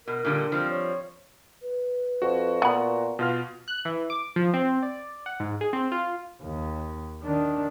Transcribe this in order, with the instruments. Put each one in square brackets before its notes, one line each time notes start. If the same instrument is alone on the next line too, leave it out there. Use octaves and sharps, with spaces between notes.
[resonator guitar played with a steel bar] B2 [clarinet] A#4
[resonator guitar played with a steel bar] A#2 D3 G3
F3 G3 C4
[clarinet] C#5
[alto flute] B4
[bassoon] F2 [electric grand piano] F#4
[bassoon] A#2 [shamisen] B3 B5
[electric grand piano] B2 F4 F6
[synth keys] F#6
E3
D6
F3
C4
D5
F#5
G#2
G#4
C4
F4
[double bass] D#2
D#3 D4